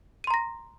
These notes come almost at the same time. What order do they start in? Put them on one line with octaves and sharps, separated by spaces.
D#7 C6 A#5 A#6